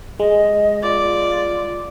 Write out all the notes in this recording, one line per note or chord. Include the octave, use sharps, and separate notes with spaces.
G#3 D#5
F4 D5